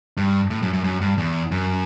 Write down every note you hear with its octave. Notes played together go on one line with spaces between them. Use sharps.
G2
A2
F#2
F#2
F#2
G2
E2
F#2